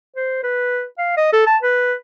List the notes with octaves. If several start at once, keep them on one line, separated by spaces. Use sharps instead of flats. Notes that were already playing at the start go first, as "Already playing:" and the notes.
C5
B4
F5
D#5
A4
A5
B4